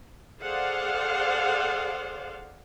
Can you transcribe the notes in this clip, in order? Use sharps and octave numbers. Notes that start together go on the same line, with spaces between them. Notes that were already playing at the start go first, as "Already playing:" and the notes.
G#4 A4 C5 D5 F5 F#5